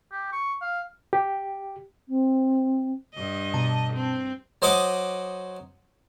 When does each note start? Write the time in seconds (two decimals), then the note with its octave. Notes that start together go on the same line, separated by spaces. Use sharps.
0.12 G4
0.32 C#6
0.62 F5
1.13 G4
2.08 C4
3.15 G2 D#5
3.54 B2 A5
3.93 C4
4.62 F#3 C5 D#5 F#5 D6 D#6